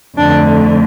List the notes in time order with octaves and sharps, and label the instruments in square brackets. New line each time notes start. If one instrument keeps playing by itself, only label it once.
[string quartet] F2 D3 A3 D4